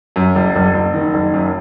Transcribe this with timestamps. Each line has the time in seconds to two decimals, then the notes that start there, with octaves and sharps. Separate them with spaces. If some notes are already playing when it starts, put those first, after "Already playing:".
0.16 F#2
0.35 F#1
0.56 F#1
0.74 F#1
0.94 D#3
1.14 F#1
1.34 F#2